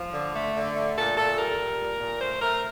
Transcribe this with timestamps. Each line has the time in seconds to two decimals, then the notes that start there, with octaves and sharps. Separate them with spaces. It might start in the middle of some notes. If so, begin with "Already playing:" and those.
Already playing: F3
0.13 D3
0.35 A3
0.55 D3
0.75 A3
0.97 A#2 A4
1.18 A#2 A4
1.38 G3 A#4
1.58 G3
1.79 A#2
2.00 A#2
2.20 A3 C5
2.41 A3 A#4